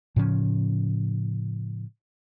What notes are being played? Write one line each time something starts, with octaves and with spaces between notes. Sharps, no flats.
A2 C#3 F3 C#4